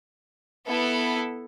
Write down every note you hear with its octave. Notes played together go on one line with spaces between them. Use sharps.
B3 E4 A4